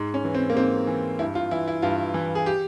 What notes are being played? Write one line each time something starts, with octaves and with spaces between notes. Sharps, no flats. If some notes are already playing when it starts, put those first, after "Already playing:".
Already playing: G#2
C#4
E3
C4
A#3
G#2 C4
E3
G2 E4
F4
E3 E4
E4
G2 F4
E3
G#4
G4